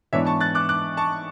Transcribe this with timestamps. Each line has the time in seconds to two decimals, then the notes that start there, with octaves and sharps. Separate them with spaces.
0.13 G#2 E3 B3 D4 C#5 E5
0.26 A5 C#6
0.41 F#6 A6
0.55 D6 F#6
0.69 D6 F#6
0.97 A5 C#6